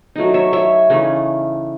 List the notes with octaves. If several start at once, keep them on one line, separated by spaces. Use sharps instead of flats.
F#3 A3 D#4
C#5 E5
C#5 E5
C#3 E3 A3 D#4